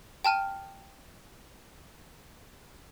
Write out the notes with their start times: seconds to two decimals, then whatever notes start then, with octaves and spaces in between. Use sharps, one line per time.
0.25 G5 A5 F6 D#7